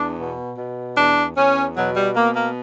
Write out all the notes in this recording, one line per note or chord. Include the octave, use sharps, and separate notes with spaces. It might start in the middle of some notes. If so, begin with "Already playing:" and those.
Already playing: E2 D4
B2
B2
E2 D4
E2 C#4
B2 F#3
G3
B2 A#3
A#3